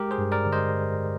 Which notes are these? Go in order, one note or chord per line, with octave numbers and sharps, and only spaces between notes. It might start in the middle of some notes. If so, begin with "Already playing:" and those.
Already playing: G#3 G4 A#4
G#4 C5
G2
A#4 D5
D3
C5 D#5